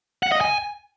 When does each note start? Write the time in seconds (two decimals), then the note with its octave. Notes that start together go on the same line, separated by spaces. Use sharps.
0.23 F#5
0.32 D#5
0.41 G#5